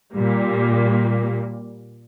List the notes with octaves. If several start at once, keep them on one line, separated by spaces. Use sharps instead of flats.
A#2 G3 A#3